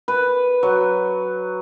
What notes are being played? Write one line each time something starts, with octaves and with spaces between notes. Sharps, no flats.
B4
F#3